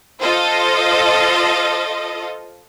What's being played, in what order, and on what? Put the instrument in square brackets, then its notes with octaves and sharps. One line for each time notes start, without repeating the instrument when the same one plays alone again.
[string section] F4 A4 C5 D#5